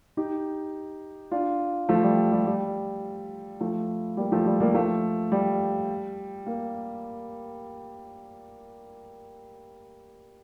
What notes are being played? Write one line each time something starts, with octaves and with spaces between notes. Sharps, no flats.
D#4 G4
D4 F4
F3 A3
G3
G3
G3
F3 A3
G3 A#3
F3 A3
G3
G3 A#3
F3 A3
G3
A#3